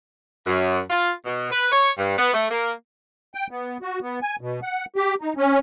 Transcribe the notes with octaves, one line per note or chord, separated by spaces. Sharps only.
F#2
F4
B2
B4
C#5
G2
B3
A3
A#3
G5
B3
F#4
B3
G#5
B2
F#5
G4
D#4
C#4